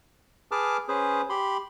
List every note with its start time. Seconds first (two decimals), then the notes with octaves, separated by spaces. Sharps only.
0.52 G#4 B4 A5 D6 F6
0.88 C#4 G#4 B4 C5
1.30 G4 B5 C6